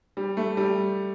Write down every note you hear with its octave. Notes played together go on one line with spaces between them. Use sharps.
G3
A3
G3